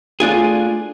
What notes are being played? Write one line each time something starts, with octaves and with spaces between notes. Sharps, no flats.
A3 D4 F4 G#4